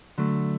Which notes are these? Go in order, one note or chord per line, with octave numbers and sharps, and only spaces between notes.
D3 F#3 A3